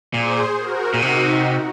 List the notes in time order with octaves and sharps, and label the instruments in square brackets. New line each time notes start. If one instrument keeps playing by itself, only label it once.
[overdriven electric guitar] A#2 [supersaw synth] G#4 C5
[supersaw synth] F#4 A#4
[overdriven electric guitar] A#2
[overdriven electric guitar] C3 [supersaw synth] D#4 F#4